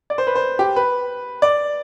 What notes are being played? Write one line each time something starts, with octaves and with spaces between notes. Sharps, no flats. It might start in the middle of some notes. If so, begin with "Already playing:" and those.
D5
C5
B4
C5
G4
B4
D5